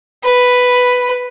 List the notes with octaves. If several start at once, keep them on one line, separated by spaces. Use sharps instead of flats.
B4